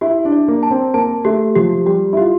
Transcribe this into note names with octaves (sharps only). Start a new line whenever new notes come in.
E4 G4
D4
D5
A#3
A5
C4
A#3 A5
A3 G4
F3 G4
G3 G4
E4
F4 G4